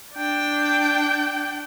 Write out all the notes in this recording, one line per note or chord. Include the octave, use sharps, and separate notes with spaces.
D4 G5